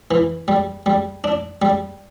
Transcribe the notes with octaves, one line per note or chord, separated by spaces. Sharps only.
E3
G3
G3
D4
G3